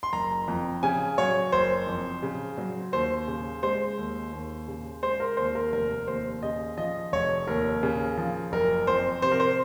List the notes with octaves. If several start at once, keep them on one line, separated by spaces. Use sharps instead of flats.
C6
F#1 A#5
F2
C#3 G#5
F#3 C#5
F#1 C5
F2
C#3
F#3
D#2 C5
C#3
G#3 C5
D#2
D#2
C#3
G#3 C5
A#4
D#2 C5
A#4
F1 A#4
D#2 C5
C#3 D#5
F3 D#5
F1 C#5
D#2 A#4
C#3
F3
F#1 A#4
F2 C5
C3 C5
A#4
C5